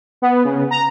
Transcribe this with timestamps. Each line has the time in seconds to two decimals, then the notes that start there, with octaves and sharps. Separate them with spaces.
0.22 B3
0.44 C#3
0.71 A#5